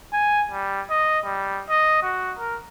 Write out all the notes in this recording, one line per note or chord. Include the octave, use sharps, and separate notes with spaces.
G#5
G3
D#5
G3
D#5
F#4
A#4